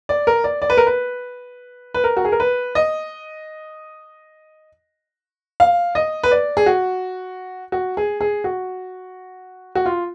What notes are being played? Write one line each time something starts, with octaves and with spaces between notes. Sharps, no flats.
D5
A#4
D5
D5
B4
A#4
B4
B4
A#4
F#4
G#4
A#4
B4
D#5
F5
D#5
B4
D5
G#4
F#4
F#4
G#4
G#4
F#4
F#4
F4